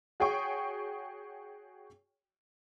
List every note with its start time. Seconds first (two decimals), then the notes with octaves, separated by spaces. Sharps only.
0.20 F#4 G#4 C#5 G5 C#6